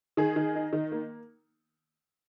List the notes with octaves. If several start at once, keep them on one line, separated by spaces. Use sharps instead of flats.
D#3 G#4
D#3
D#4
D#3
A#3